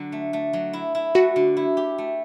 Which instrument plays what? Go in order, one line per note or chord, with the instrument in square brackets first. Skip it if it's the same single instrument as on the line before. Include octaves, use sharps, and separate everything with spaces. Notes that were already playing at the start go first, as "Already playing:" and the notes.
Already playing: [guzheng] D3 F#3
A3
A3
F#3
E4
E4
[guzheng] A3 [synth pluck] F#4
[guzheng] D3
E4
G4
A3